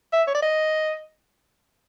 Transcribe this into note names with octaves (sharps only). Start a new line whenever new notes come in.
E5
C#5
D5
D#5